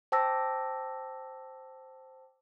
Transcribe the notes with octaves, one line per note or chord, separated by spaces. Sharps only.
C5 G5 A5 D6 E6 A#6